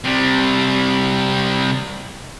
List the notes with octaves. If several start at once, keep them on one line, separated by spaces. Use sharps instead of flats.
C3 G3